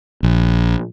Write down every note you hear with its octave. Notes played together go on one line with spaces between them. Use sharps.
A#1